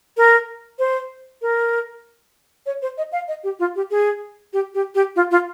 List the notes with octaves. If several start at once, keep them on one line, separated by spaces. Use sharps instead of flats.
A#4
C5
A#4
C#5
C5
D#5
F5
D#5
G4
F4
G4
G#4
G4
G4
G4
F4
F4